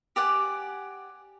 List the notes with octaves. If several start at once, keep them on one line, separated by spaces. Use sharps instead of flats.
G4 D5 F#5 G#5